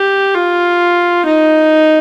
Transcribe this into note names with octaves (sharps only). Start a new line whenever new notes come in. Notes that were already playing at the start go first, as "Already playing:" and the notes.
Already playing: G4
F4
D#4